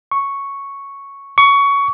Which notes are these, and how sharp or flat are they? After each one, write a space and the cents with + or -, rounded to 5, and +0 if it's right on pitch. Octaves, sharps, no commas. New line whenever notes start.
C#6 +0
C#6 +20